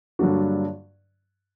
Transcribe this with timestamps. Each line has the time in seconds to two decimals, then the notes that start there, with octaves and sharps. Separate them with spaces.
0.19 G2 D3 F#3 A#3 D4 F#4